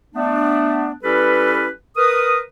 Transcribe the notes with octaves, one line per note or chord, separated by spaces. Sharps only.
A3 B3 D4
G3 C#4 E4 G4 A4 B4
A#4 B4 D#6